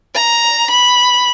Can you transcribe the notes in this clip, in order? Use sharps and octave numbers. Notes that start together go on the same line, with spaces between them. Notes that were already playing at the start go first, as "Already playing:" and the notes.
A#5
B5